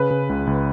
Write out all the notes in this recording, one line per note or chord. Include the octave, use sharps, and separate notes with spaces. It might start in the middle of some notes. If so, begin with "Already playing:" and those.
Already playing: C#3 B4
C#3
C#2
C#2